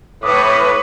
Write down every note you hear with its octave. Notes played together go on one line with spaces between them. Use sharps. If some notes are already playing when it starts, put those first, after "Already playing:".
A2 B4 C#5 D6 D#6